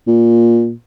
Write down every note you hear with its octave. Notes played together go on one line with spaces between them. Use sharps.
A#2